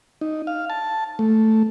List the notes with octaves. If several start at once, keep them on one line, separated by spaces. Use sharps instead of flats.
D#4
F5
A5
A3